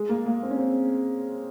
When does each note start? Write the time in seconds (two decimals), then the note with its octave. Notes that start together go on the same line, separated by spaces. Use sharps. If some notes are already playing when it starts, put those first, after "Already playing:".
Already playing: G#3
0.09 A#3
0.26 A#3
0.43 C4
0.50 C#4
0.58 C4